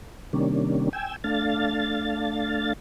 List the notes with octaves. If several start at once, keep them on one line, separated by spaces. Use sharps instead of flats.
C3 D#3 G3 A#3 C#4 D4
G5 G#5 E6
A3 D4 F5 A6